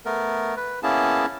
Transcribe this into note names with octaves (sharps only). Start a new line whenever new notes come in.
A3 B3 A#4
B4
A#3 B3 C#4 E4 G#4 A5